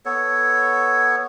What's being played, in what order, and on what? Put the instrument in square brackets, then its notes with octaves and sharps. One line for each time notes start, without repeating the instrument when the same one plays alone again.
[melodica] B3 A4 C#5